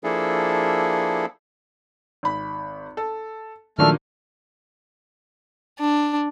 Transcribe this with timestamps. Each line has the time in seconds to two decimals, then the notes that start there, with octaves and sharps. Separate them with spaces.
0.04 F3 A#3 D4 E4 G#4 A4
2.23 G#1 B5
2.97 A4
3.79 A#2 D#3 F3 F#3 A3 A#3 D4 F6
5.79 D4